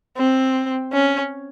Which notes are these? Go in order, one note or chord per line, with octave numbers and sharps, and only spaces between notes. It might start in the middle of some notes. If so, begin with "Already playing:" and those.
C4
C#4